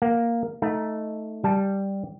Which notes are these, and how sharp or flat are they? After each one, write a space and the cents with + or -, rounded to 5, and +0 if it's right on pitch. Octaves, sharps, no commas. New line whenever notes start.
A#3 +0 F#5 +0
A3 +0 D#4 +15
G3 +0 A5 -15